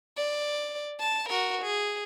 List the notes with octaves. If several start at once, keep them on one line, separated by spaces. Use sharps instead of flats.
D5
A5
F#4 A#4
G#4